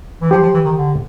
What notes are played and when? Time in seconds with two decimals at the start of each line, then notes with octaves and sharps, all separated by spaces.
0.21 E3
0.31 F3 G4
0.42 F3
0.54 E3
0.65 D#3
0.77 D3